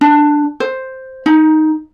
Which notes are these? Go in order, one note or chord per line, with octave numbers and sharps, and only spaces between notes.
D4
C5
D#4